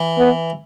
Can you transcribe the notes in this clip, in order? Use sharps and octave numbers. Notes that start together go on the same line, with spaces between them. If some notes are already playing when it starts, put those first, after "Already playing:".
Already playing: E3
B3